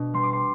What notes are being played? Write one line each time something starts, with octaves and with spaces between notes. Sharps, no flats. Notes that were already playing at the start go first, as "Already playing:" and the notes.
Already playing: B2 D4
G3 C6
D6
C6